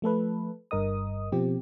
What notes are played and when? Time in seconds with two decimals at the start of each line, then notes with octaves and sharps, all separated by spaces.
0.02 F3 A3 A4 B4
0.71 G1 G2 A#4 D#5 D#6
1.32 B2 F3 C4 G4